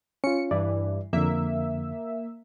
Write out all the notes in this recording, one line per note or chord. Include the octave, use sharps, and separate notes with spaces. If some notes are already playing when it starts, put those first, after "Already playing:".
C#4 F4 C#7
G2 E3 D5
F2 D3 A#3 E5